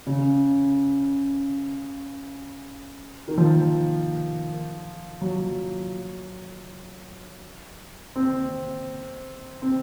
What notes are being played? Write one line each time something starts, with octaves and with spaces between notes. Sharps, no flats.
C#3
D#3
F3
F#3
C4
C4